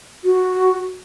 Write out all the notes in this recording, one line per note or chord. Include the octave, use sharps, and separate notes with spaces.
F#4